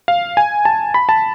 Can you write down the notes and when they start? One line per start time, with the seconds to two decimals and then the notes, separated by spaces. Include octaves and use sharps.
0.08 F5
0.37 G#5
0.65 A5
0.94 B5
1.09 A5